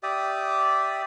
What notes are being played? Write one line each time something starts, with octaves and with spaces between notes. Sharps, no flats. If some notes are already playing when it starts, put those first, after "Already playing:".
G4 D5 E5 D#6